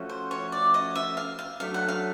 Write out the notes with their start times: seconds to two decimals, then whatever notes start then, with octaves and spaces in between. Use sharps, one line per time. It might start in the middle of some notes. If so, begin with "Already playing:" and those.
Already playing: F3 A3 C#4 F#4
0.09 C5
0.31 C#5
0.52 D5
0.74 D#5
0.96 E5
1.17 F5
1.39 F5
1.60 F#3 A3 D4 F5
1.74 F#5
1.88 F5